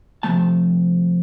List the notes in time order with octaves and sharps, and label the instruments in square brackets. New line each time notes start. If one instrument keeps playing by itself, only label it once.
[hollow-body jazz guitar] C3 F3 A3 A5